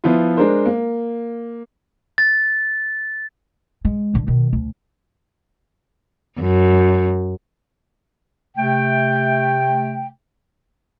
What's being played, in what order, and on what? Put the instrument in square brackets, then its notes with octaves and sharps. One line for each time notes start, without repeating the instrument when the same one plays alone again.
[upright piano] F3 B3 E4 F4
G#3 D4 A#4 C5
A#3
[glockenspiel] A6
[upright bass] G#3
A2 D3
B2 D#3
D2
[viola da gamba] F#2
[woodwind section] C3 A3 G5